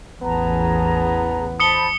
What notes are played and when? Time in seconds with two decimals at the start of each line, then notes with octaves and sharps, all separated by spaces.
0.23 A1 E2 B3 G#4 A5 A#5
1.60 C5 A5 B5 D#6 C#7 G7